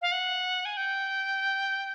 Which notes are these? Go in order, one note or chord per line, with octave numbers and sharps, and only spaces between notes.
F5
F#5
G#5
G5